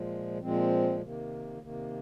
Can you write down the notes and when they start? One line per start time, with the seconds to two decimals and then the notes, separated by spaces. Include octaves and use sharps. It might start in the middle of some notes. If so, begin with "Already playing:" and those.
Already playing: A#2 F3 G#3
0.42 A#2 F3 G#3 C4
1.02 C3 D#3 A#3
1.61 C3 D#3 A#3